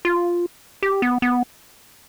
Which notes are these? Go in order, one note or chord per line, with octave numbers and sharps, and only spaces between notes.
F4
G4
B3
B3